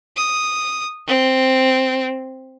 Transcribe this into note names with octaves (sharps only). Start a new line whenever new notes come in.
D#6
C4